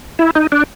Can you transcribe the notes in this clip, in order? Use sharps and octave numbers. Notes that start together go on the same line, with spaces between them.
E4
D#4
D4